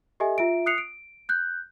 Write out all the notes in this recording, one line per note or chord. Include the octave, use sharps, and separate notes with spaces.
G4 A4 D#5 E5 G#5
F4 E5 D7
D#6 F#6 C7 C#7 F7
D7
F#6 G6